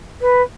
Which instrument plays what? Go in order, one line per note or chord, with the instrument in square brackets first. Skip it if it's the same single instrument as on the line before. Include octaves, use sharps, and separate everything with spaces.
[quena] B4